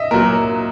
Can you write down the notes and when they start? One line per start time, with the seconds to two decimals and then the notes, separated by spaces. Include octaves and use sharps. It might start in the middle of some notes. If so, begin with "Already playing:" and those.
Already playing: D#5 E5
0.11 A#2 F#3 A#4